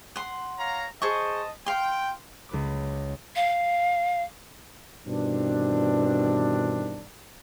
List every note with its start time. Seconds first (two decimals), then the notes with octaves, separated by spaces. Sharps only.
0.16 F#5 C6
0.59 C#5 F5 A#5
1.02 G#4 C5 D#5 A5 C#6
1.66 F5 G5 C6
2.49 C#2 B4 D6
3.36 F5
5.07 G2 B2 D#3 E3 C4 D4